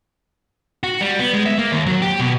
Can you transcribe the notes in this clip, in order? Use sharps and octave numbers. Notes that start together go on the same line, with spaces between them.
F#4
G3
B3
G#3
E5
A#3
D#2
F#3
G4
B2